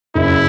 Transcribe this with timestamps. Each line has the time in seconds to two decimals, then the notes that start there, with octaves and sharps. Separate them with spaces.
0.15 F#1 E4